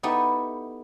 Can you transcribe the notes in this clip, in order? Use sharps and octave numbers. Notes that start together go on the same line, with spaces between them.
B3 D#4 E4 G4 A4